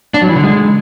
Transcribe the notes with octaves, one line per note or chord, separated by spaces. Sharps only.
D4
F#3
E3
D3
G#3